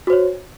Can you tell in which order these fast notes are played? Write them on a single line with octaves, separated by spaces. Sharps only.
F#4 C5 C#5